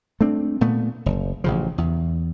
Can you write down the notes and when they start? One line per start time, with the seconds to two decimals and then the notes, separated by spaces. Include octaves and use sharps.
0.21 A3 C4 D4
0.61 A#2 A3 B3
1.06 F#1
1.44 A1 C#3 F3
1.78 E2